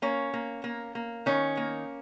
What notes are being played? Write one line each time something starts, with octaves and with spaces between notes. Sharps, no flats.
A#3 C#4
A#3
A#3
A#3
D#3 C#4
A#3